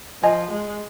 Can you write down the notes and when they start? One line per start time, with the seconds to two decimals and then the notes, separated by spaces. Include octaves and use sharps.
0.23 F3 D#5 G#5
0.51 G#3